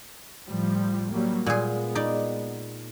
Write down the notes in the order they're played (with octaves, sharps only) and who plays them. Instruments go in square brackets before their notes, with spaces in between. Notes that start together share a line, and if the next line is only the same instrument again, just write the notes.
[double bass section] A2 F3 G3
F#3 G3 A#3
[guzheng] A#2 G#4 [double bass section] G#3 B3
[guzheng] D#4 D5